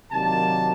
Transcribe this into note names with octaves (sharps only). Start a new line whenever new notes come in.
C3 D#3 F#3 A#3 D4 A5